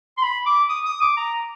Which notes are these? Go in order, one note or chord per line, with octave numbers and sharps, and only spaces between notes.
C6
B5
D6
D#6
D#6
D6
A#5